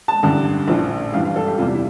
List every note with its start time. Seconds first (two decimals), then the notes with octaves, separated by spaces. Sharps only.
0.08 A5
0.23 A1 G2 D3
0.68 A#1 A2 F3
1.13 A1 G2 E3 F5
1.25 F5
1.36 A4
1.47 G4
1.58 E2 C3 G3 F4
1.74 E4